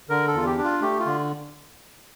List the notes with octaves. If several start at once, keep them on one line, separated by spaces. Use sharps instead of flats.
D3 A#4
A4
E2 F4
G4
D4
F4
A3 G4
F4
D3